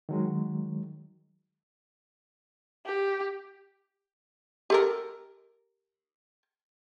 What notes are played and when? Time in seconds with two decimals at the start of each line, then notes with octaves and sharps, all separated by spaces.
0.09 D#3 F#3 G#3
2.86 G4
4.70 G4 A4 A#4